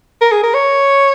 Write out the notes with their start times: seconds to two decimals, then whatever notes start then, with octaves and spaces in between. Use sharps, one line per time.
0.21 A#4
0.32 G#4
0.43 A#4
0.54 C#5